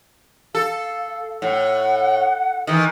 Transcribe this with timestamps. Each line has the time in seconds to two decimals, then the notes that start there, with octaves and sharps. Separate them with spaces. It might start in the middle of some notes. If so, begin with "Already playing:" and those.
0.55 A4 F5
1.42 A2 F#5
2.67 D#3 E3 D#6